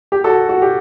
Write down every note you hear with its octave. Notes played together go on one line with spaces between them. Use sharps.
G4
F#4 A4
F#4
G4